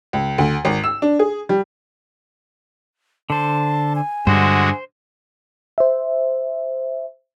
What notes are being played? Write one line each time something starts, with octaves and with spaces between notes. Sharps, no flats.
C#2
D2
G#1
E6
D4
G#4
G3
D3 C5 A5
G#5
G2 D3 G#3 F#4 C5
C5 E5